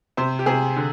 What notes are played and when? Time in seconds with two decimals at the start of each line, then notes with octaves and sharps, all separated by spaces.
0.17 C3 C5
0.39 G4
0.46 C3 G#4
0.76 D3